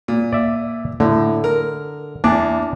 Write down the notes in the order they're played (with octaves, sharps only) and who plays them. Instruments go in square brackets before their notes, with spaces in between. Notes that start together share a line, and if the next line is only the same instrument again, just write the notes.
[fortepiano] A#2
[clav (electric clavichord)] D5 E5
[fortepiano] A2 [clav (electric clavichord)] D3
[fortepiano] A#4
[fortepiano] E2 [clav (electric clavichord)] D4 D5